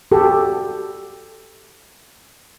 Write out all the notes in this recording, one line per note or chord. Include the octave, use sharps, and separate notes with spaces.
F#4 G4 A4